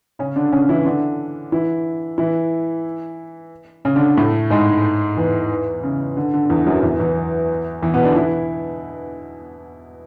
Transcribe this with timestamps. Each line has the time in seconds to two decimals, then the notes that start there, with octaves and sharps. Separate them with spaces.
0.19 C#3 C#4
0.36 D3 D4
0.52 C#3 C#4
0.69 E3 E4
0.86 D3 D4
1.52 E3 E4
2.18 E3 E4
3.85 C#3 C#4
3.96 D3 D4
4.17 A2 A3
4.50 G#2 G#3
5.17 E2 E3
5.83 C#3
6.17 D3
6.34 D3
6.45 D3
6.50 E2 E3
6.66 F#2 F#3
6.83 E2 E3
6.99 E2 E3
7.82 E2 E3
7.94 B2 B3
8.05 D3 D4
8.15 E3 E4